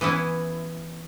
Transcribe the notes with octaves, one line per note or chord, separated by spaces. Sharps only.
E3 B3 C#4 E4